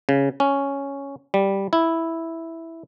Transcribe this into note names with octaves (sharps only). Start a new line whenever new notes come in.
C#3
C#4
G3
E4